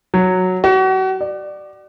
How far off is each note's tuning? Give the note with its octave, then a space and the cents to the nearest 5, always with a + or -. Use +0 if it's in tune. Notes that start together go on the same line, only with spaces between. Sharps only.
F#3 -5
F#4 +35
D5 +20